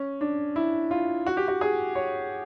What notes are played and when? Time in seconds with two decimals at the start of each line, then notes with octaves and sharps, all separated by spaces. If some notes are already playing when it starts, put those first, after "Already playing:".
Already playing: C#4
0.21 D4
0.56 E4
0.91 F4
1.26 F#4
1.37 G4
1.48 F#4
1.61 G#4
1.95 C#5